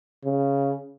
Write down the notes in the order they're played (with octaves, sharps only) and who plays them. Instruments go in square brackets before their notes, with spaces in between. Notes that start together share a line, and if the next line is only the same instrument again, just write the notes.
[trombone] C#3